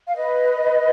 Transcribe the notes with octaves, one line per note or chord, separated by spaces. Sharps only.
F5
B4 D#5